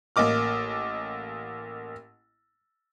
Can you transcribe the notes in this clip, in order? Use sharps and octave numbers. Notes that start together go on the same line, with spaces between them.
A1 A#3 D#5 D6 F6